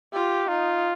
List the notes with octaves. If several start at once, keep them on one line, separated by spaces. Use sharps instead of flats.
F4 G4
D#4 F4